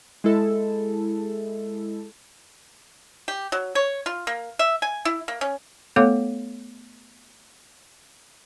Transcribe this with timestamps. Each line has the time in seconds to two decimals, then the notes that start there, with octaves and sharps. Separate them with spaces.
0.24 G#3 E4 A4
3.28 G4
3.52 F#3
3.75 C#5
4.06 F4
4.27 A#3
4.59 E5
4.82 G#5
5.05 E4
5.28 A#3
5.41 C#4
5.96 A3 B3 A4 C#5 F5 D6